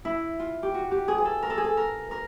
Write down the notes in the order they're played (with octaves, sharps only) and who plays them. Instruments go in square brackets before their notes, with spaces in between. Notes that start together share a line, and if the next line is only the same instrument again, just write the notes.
[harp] E4
F4
G4
F#4
G4
G#4
G#4
A4
A#4
A4
G#4
A4
A#4
A#4